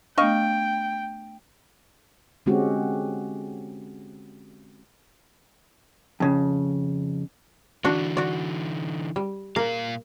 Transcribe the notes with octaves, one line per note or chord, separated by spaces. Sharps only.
A3 B3 D4 D#5 F5 G5 C#6
D3 G#3 C4 C#4 F#4 G4
F2 C#3
D3 E3 D4 F#4
F#4 D5
G3
A#2 A#3 A#4 F5